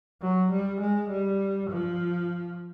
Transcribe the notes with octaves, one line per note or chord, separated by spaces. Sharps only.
F#3
G3
G#3
G3
F3